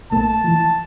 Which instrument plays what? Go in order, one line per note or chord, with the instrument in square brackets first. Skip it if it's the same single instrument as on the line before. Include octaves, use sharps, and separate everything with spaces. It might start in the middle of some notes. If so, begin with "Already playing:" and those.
[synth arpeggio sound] A#1 A3 A#3 [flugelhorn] A5
[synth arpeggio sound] E3 F3